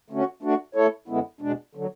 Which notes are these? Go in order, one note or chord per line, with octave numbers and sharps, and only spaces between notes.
D3 A3 C#4 F#4
A3 D4 F#4
A3 E4 A4 C#5
F#2 D3 G#3 B3 E4
E2 B2 G#3 D4
D3 F#3